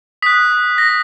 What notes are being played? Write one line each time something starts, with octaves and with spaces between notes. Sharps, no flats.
D#6 F#6 B6
A#6